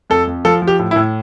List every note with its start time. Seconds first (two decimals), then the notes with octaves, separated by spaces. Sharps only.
0.10 F2 A4
0.27 F2
0.45 F3 A4
0.62 F3
0.67 G4
0.79 A2
0.91 E4
0.96 A2